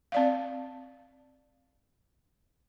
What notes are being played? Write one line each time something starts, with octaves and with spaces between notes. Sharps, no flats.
C4 D5 F5